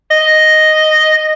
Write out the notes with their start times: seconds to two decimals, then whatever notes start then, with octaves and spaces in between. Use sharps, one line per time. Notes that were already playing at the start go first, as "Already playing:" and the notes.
0.11 D#5